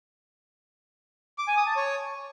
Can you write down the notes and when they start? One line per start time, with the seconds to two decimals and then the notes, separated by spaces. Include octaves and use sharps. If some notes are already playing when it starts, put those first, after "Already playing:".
1.38 D6
1.48 G#5
1.57 D#6
1.67 A5
1.76 C#5